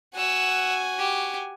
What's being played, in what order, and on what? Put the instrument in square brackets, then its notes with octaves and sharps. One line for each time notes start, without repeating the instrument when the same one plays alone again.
[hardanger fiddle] F#4 G#5 [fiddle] F#5 E6
[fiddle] G4